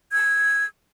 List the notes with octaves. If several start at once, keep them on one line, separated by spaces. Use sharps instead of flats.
E6 G#6